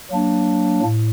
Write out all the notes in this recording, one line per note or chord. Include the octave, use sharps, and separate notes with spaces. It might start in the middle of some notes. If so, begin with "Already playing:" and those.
F#3 A#3 D4
A2